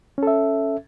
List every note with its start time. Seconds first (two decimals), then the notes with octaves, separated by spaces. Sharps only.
0.18 C#4
0.23 A4
0.27 E5